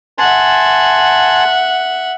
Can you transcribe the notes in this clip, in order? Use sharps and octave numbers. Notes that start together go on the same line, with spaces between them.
E5 F#5 G#5 A5 C6